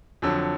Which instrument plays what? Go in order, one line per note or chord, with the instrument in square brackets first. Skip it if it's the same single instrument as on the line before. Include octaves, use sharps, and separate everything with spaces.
[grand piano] F2 D3 F#3